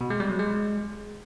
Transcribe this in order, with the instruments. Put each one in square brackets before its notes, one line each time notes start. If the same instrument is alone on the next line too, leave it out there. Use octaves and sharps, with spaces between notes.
[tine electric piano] B2
G#3
G3
F#3
G#3